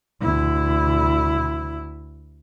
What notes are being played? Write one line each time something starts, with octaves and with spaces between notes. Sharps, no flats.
D2 E4